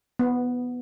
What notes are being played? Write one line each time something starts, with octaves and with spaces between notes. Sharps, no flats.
B3